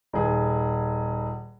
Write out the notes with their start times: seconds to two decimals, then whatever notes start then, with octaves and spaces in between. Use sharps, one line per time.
0.13 D#1 G#4